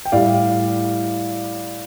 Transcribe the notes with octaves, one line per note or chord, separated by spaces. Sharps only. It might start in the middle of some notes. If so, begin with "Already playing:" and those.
G5
A2 G3 D5 F5